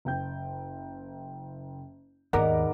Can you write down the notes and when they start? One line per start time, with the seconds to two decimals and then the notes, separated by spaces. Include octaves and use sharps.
0.05 F#1 G5 G6
2.33 D#2 G#2 B3 A#4 D5 F#5 A#5 D6